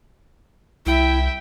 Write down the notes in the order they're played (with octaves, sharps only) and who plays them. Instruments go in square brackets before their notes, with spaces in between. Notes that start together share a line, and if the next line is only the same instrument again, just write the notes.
[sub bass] C2 [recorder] E4 [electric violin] E5 G5